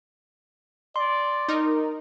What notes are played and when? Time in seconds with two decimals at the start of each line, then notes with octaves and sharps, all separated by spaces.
0.96 D5 C6
1.48 D#4 A#4